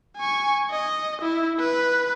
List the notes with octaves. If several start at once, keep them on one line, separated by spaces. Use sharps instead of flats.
G#5 C#6
D#5
E4
B4